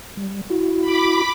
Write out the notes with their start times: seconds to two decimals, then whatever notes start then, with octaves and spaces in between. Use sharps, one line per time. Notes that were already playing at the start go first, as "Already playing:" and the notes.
0.17 G3
0.50 E4 F#4
0.81 B5 D6